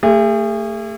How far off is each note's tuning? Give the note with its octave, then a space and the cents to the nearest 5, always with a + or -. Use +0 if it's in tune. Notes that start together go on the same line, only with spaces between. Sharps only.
A3 +30 G#4 -35